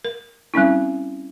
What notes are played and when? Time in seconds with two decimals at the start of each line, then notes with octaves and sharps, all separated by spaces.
0.05 A#4
0.54 G3 C4 C#4 E4